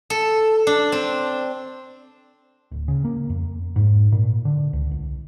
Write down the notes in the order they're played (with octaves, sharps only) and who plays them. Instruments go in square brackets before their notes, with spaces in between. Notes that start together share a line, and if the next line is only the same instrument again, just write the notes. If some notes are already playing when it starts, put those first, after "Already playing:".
[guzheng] A4
D4
C4
[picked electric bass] D1
C#3
A#3
F2
G#2
A#2
D3
C#2
C2